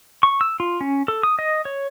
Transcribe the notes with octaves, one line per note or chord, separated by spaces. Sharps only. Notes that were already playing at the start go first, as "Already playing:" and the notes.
C#6
E6
F4
C#4
A4
D#6
D#5
C#5